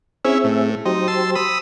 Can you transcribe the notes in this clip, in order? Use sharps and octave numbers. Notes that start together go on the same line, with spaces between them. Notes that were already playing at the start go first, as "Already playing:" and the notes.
C4 C#4 E4 G#4 E5
A2
F#3 D#4 G4 C5
A5 C6 E6
B5 D#6 E6